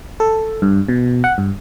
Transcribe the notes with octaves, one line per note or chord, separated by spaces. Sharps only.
A4
G2
B2
F#5
G2